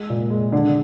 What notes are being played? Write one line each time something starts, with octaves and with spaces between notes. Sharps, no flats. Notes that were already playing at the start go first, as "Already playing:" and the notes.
Already playing: G#3
A#2
G#3
D3 D4